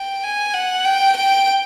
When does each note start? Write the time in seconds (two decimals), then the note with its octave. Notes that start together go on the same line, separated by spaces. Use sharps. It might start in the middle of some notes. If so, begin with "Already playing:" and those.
Already playing: G5
0.23 G#5
0.54 F#5
0.85 G5
1.16 G5